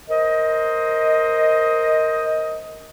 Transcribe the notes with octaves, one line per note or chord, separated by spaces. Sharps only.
A#4 C5 D#5